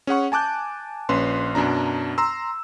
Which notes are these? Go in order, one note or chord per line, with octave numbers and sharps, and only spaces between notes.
C#4 G#4 F#5 C#6
G#5 A5 D6 F#6 G6
A#1 C#4 B4 C6
F#2 B2 D4 A#5
A#5 C6 E6